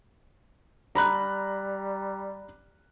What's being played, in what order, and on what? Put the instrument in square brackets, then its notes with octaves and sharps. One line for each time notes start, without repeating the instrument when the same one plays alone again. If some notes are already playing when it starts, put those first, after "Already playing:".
[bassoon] G3 [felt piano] A#5 B5 F#6